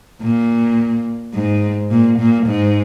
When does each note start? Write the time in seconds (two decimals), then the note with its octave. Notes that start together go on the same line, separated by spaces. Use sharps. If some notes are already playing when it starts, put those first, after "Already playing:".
0.21 A#2
1.34 G#2
1.90 A#2
2.19 A#2
2.47 G#2